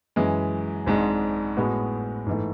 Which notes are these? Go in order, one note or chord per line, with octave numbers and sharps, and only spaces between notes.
F#2 E3 G#3
G#1 G#2 G#3 D4
A2 G#3 B3 F#4
G#2 E3 A3